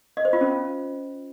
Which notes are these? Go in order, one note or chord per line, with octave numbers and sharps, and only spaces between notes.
D#5
C5
F4
C#4